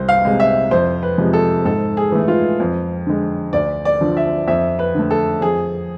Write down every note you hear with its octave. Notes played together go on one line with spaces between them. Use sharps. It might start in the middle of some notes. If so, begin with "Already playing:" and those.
Already playing: C2 C5
F5
C3 G#3
E5
F2 C5
B4
C3 F3 G#3
A4
G#2 A4
G#4
E3 A3
F4
F2
D3 G#3
D2 D5
D5
D3 F3
E5
F2 E5
B4
D3 A3
A4
F2 G#4